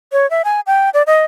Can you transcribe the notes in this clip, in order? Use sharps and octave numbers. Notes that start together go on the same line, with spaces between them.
C#5
E5
G#5
G5
D5
D#5